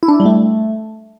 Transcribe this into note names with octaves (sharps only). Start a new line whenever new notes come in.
E4
D4
E4
G3
A3